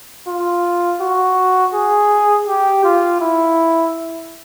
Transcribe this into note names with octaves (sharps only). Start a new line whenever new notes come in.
F4
F#4
G#4
G4
F4
E4